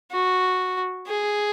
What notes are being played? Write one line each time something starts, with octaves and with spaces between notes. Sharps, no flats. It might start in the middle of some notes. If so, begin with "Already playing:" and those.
F#4
G#4